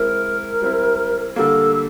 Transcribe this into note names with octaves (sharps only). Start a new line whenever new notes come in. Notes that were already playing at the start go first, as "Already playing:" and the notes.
Already playing: G#3 C4 E4 A#4
G3 C4 E4
D3 G3 A#3 A4
A4